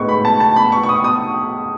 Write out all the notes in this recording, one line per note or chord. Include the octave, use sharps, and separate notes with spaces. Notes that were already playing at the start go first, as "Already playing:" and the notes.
Already playing: A2 G#3 B3 D#4 C#6
B5
A5
A5
B5
C#6
C#6
D#6
D#6